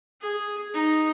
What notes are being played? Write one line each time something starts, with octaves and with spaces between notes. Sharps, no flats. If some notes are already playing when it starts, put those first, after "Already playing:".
G#4
D#4